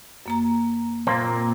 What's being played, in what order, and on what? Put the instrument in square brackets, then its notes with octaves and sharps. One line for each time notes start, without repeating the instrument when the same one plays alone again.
[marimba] F#2 A#3 A#5
[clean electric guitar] A#2 A#3 C4 [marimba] A#5 C6